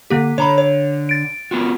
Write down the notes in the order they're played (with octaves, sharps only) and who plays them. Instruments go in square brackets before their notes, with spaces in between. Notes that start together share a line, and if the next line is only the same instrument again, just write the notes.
[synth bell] D3 A#3 G4
[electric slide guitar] D3 [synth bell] C#5 A#5 B5
[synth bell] C#5
A6 D7
[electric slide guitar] B3 F4 F#4